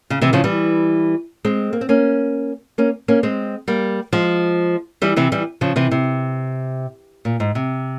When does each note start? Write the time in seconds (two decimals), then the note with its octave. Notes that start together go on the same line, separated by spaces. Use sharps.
0.10 C#3
0.22 C3 E3
0.33 C#3 F3
0.44 E3 G3
1.45 G#3 C4
1.73 A#3
1.81 C4
1.89 A#3 C#4
2.78 A#3 C#4
3.08 A#3 C#4
3.23 G#3 C4
3.68 G3 A#3
4.13 F3 G#3
5.02 E3 G3
5.16 C3 E3
5.32 E3 G3
5.61 C#3 F3
5.76 C3 E3
5.91 C3
7.25 A#2
7.40 G#2
7.55 C3